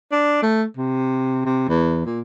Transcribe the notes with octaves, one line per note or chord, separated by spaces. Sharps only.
D4
A3
C3
C3
E2
A#2